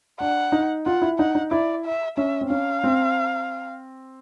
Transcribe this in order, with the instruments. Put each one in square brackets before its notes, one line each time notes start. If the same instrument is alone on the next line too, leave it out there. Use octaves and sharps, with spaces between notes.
[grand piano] D4 [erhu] F#5
[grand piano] D#4
[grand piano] F4 [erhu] F#5
[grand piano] E4
[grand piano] D#4 [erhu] F#5
[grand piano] D#4
[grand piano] E4 [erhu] D5
[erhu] E5
[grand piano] C#4 [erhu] E5
[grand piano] C4
[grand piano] C#4 [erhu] F5
[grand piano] C4